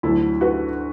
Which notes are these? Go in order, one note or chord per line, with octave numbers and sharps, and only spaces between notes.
D2 D3 F#3 E4 A4
F#4 B4